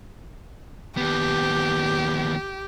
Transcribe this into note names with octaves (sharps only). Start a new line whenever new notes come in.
D#2 B3 G4